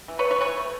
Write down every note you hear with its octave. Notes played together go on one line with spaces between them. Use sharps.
E3
B4 C#5
A3
B4 C#5
E3 B4 C#5
A3